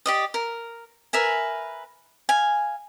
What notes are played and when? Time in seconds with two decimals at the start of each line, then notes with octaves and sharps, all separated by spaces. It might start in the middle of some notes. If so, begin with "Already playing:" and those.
0.06 G4 D5 D#5
0.34 A#4
1.13 A#4 B4 E5 G#5
2.29 F5 G#5